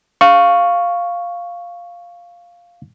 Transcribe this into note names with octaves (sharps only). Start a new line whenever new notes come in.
F5 C#6